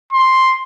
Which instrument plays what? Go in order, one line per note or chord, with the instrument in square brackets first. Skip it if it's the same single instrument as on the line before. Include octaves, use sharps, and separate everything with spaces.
[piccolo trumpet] C6